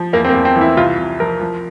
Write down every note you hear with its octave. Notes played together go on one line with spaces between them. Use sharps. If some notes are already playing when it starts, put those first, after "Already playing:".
Already playing: F3
E2 A#3
C4
A#3
E2
C4
E3
E4
C2 F4
C2
F3 A#4
F3